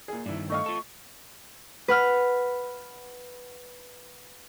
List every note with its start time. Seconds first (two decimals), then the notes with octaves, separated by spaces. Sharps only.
0.08 A#2 G#4
0.26 G2 D#3 D4 E4
0.50 A3 D#5 F5 C#6
0.66 F4 A4
1.88 B4 F#5 F6